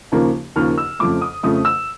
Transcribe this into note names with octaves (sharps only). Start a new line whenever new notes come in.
D#2 C#3 F3 A#3
D#2 C#3 F3 A#3 F6
E6
F2 C#3 F3 A3 D6
D#6
F2 C#3 F3 A3 D#6
E6